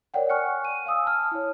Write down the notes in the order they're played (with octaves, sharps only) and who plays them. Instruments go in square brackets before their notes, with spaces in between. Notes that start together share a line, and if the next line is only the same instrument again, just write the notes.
[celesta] A#4 C#5 D5 F#5 G5
G#5 C#6 F6 F#6 C#7
D#7
F5 G#5 D#6 E6
A5 D#6 F6
E4 C#5